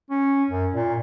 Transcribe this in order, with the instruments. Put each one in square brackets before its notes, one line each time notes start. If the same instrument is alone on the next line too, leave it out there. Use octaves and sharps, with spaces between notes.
[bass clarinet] C#4
F#2
A#2